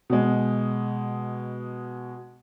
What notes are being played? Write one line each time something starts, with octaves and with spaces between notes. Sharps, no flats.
B2 G#3